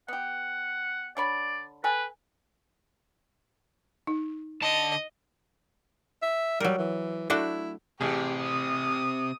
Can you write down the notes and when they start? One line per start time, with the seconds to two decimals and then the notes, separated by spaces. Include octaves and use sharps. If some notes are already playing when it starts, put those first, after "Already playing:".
0.08 B3 G4 F#5
1.17 D3 C#5 D5 B5
1.84 A4 B4 G5 G#5
4.07 D#4
4.62 D3 D#5 A5
6.22 E5
6.60 F#3 G3 A#4
6.78 E3
7.30 A3 D4 E4 F#4
8.01 A1 C3 G4 G#4
8.42 D#6